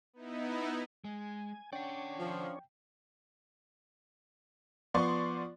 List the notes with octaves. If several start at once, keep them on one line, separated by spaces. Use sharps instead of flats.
B3 D#4 E4
G#3 G#5
C#4 D4 C#5 D5 F#5 G5
F3
F3 B3 D5 C6 C#6